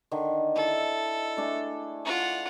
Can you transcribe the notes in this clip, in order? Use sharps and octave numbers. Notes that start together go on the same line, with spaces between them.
D3 D#3
E4 A4
A3 D4 G#4
F4 F#5